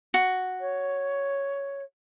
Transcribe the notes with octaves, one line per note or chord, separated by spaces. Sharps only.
F#4
C#5